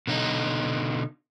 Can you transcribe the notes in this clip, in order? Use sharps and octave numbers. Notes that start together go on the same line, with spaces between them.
B2 D3 D#4